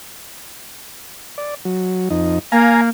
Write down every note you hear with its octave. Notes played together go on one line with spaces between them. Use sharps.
D5
F#3
F2 D#4
A#3 F5 G#5 A#5